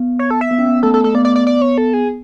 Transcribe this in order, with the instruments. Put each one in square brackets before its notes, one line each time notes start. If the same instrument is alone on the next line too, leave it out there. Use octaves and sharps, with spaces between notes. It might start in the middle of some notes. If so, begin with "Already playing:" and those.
Already playing: [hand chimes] B3
[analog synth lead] C#5
A4
E5
[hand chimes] B3
C#4
B3
[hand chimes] A3 [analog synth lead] A4
[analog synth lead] A4
[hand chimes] A3 [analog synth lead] A4
[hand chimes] B3 [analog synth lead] D5
[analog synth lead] D5
D5
D5
C#5
A4
G#4